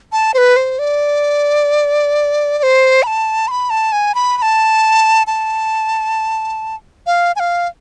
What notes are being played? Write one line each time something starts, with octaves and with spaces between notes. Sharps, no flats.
A5
C5
B4
C5
D5
D5
C5
B5
A5
C6
B5
A5
G#5
B5
B5
A5
A5
F5
G#5
F5